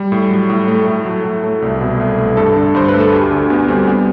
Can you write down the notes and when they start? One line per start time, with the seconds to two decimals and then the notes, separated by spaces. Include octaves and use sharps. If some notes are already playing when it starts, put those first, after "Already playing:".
Already playing: G3
0.12 A2
0.30 F#3
0.50 A2
0.68 A3
0.87 A2
1.05 F#3
1.24 A2
1.44 A3
1.62 C2
1.81 B2
2.00 C2
2.18 A3
2.37 G2 A4
2.56 D3
2.75 G2 C5
2.88 B4
2.94 A3
3.00 A4
3.13 D2 G4
3.31 D3
3.50 D2 B3
3.68 G3 C4
3.88 B3